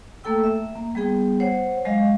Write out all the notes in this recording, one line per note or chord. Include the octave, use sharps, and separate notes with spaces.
A3 A#3 A4 G5 E6
E5
A#3
G3 B3 G#4 G5
C5 C#5 F#5
F#3 G#3 D#5 F5